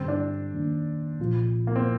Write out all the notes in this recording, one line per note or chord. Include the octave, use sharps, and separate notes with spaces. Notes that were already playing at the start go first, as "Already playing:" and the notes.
Already playing: G2 D3 G3 C4
D4
F2 D#3 A#3 D4
C2 A#2 F3 C4 F4
A#3
C4